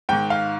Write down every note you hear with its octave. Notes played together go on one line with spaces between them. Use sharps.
G#2 D#3 G5
F5